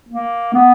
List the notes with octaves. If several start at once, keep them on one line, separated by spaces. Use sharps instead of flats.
A#3
B3